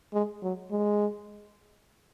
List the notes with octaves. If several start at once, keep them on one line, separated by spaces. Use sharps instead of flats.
G#3
F#3
G#3